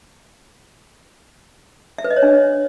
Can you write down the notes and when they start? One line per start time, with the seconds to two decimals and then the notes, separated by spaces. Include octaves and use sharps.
1.98 E5
2.04 B4
2.10 D#5
2.16 C#5
2.23 D4